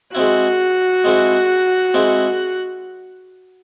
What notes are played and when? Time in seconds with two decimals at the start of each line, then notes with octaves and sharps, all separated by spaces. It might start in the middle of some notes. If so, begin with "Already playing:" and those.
0.15 G#3 C4 E4 F#4
1.04 G#3 C4 E4
1.94 G#3 C4 E4